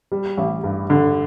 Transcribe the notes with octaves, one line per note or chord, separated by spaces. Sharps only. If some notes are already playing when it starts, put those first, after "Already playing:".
G3
A1
G2
D3